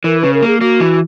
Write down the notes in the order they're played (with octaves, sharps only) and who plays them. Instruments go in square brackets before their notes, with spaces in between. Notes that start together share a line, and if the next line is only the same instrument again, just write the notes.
[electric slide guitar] E3 [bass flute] A#4
[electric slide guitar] C#3 [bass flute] B4
[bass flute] A#4
[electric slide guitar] A#3 [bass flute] G#4
[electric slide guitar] A#3 [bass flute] F#4
[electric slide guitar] E3